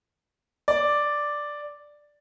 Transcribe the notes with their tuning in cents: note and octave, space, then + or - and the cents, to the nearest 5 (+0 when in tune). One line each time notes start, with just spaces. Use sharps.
D5 +0